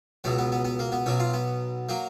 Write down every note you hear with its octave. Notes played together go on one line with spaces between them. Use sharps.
C#2 B2 F#3 B3
B3
B3
B3
A#3
B3
B1 B2 F#3 C#4
F4
B3
F#3 A#3